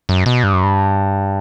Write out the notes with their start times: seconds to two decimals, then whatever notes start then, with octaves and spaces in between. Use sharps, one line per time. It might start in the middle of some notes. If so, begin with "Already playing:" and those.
0.09 F#2
0.26 B2
0.43 G2
0.53 F#2
0.63 G2